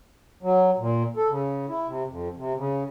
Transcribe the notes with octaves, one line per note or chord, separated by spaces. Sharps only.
F#3
A#2
A4
C#3
E4
C3
F2
C3
C#3